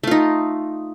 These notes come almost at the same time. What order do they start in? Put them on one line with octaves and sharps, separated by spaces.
A3 F4 D#4